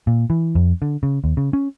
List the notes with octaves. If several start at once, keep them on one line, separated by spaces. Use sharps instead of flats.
A#2
E3
F2
D3
C#3
D#2
C#3
C#4